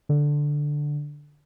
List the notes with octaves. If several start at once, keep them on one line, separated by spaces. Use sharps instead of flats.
D3